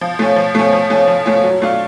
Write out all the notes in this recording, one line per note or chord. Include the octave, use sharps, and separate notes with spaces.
F3
A3 C#4
F3
A3 C#4
F3
A3 C#4
F3
A3 C#4
F#3
A3 D4 F4